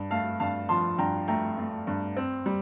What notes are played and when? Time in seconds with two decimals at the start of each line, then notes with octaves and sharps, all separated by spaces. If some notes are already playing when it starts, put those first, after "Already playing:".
Already playing: G2
0.10 A3 F5 A5
0.40 G2 F5 A5
0.69 F3 A5 C6
0.98 G2 G5 A#5
1.28 A3 G5 A#5
1.57 A3
1.87 G2
2.17 C4
2.46 G3